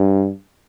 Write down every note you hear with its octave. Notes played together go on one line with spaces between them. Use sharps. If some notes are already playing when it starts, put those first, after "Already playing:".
Already playing: G2